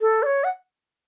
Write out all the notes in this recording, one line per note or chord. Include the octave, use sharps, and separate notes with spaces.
A4
D5
C#5
F#5